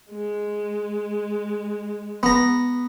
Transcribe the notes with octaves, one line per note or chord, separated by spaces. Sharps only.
G#3
B3 A#5